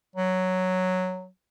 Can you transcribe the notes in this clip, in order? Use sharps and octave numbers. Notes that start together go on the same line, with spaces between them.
F#3